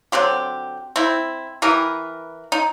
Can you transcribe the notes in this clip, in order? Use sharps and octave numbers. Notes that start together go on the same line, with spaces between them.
D3 F#3 C4 G4
C4 E4
E3 G4 A#4 B4
D#4